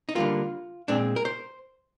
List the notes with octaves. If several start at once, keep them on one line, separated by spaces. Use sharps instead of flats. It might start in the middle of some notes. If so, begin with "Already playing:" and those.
D#4
D3 G3 A#3 F4
A#2 G#3 C4 D4
A#4
C5